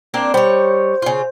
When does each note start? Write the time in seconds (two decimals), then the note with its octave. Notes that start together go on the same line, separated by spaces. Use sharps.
0.14 A#3 C4 D4
0.34 G3 C5 C#5
1.02 C#3 F4